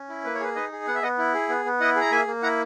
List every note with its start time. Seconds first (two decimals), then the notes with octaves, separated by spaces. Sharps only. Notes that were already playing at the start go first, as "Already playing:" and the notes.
Already playing: C#4
0.09 E4
0.25 A#3 B4
0.35 C#5
0.40 G#4 B4
0.56 D#4 B4 D#5
0.72 G#4
0.87 B3 F#5
0.95 E5
1.03 B3 D#5 F#5
1.18 E4
1.34 G#4
1.49 B3
1.65 B3
1.80 E4 D#5 F#5
1.96 G#4
2.01 A#5
2.11 A#3 E5 G#5
2.27 A#3
2.43 E4 F#5 A#5